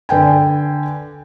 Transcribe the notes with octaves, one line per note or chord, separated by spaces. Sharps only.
D3 B4 G5 G#5